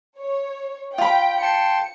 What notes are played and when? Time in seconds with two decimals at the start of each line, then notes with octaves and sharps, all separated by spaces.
0.19 C#5
0.98 F4 G5 B5
1.42 G5 A5 C6 C#7